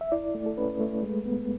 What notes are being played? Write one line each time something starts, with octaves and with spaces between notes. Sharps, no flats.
E5
E4 D5
A3
A4
C#4 B4
A3
G#3
B3